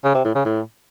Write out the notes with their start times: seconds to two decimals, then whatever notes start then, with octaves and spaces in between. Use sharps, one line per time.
0.04 C#3
0.15 C3
0.25 A2
0.35 C#3
0.45 A2